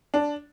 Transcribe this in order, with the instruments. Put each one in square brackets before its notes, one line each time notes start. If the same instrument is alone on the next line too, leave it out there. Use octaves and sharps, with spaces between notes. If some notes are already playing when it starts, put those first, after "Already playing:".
[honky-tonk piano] D4